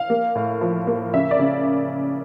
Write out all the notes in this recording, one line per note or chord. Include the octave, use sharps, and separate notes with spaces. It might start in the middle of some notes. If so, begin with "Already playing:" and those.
Already playing: F5
A#3
A2
F3
A#3
C#3 E5
D5
C#3